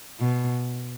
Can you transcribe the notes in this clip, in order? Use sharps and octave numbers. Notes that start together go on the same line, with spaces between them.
B2